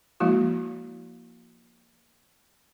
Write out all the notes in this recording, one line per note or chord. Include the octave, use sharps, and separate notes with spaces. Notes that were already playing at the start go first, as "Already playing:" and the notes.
F3 G#3 A#3 E4 F#4